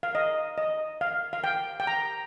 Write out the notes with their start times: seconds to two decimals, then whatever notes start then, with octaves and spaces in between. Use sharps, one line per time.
0.03 F5
0.15 D#5
0.58 D#5
1.01 F5
1.33 F5
1.44 G5
1.80 G5
1.87 A#5